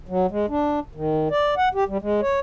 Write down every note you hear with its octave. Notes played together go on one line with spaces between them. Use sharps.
F#3
G#3
D4
D#3
D5
F#5
G4
G3
G#3
C#5